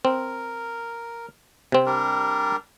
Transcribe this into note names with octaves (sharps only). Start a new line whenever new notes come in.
C4 A#4
C3 C4
G3 D4 A#4